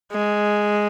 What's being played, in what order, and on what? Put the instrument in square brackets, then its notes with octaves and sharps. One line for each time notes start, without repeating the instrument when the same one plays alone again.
[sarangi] G#3